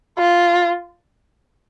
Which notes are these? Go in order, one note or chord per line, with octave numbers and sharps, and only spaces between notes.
F4